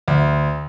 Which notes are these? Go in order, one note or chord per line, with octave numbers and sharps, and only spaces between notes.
D2